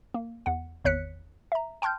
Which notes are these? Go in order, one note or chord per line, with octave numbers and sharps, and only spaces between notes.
A#3
E2 F#5
G#1 E2 C#5 F#6 B6 C#7
E5 A#5
G5 A5 C6 F6 G6